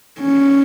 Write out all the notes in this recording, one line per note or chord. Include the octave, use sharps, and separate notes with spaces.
C#4